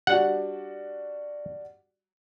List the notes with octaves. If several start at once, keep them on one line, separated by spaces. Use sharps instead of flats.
G3 D4 F#4 F#5